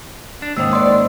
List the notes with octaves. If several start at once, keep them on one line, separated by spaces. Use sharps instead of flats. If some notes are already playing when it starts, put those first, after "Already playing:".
D4
D#2 G#2 D#3 C#4 C5 D#5 D#6 E6
B4 C#5 D5 C6 D#6 E6